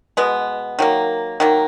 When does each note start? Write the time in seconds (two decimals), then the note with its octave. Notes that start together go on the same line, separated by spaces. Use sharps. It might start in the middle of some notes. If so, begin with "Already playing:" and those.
0.17 B2 G#3 B3
0.79 D#3 F#3 A#3
1.40 D#3 F#3 A#3